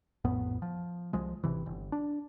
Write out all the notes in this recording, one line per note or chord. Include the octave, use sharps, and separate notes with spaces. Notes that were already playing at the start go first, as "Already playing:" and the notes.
A#1 F2 A2 B3
F3
C2 F3 G#3
G#1 C3 E3
G1
D4